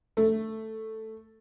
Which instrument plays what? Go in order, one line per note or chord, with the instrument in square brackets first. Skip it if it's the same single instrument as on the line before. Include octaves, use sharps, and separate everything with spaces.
[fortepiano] A3